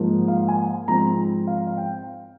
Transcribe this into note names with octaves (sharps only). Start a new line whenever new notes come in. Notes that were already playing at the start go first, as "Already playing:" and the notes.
Already playing: G#2 F3 A#3
F5
G#5
G#2 F3 C4 A#5
F5
F5
G5